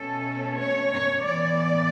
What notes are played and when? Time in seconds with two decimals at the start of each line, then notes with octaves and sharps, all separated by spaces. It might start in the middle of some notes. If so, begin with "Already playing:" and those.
Already playing: B2 A3 C#4 A4
0.57 C#5
0.91 C#5
1.24 A2 E3 B3 D5